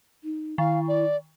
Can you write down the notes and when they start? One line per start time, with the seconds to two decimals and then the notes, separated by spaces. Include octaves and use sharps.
0.24 D#4
0.58 D#3 E4 F5
0.88 D5